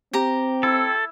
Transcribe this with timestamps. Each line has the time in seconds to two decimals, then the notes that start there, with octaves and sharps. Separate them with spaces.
0.13 C4 G4 A#5
0.63 E4 A4